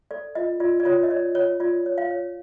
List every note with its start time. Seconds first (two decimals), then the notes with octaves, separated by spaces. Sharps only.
0.11 A4 D5
0.35 F4 D#5
0.60 F4 D5
0.80 D5
0.85 F4 C#5
1.03 D#5
1.10 C#5 D5
1.35 F4 C#5
1.60 F4 D5
1.86 C#5
1.98 F5
2.11 C#5